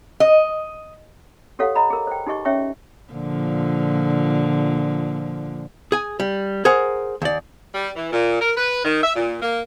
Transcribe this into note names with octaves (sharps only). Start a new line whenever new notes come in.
D#5
G4 A4 C#5 F5 F#5
D#5 F#5 A#5 B5
G#4 A#4
C5 G5
D#4 G4 G#4 D#5 C#6
C#4 C#5 E5 G5 C#6
A#2 D3 F3
G#4 G#5
G3
G#4 A#4 C5 F#5
D#2 D5
G3
E3
A#2
A#4
B4
D#3
E5
A#2
A#3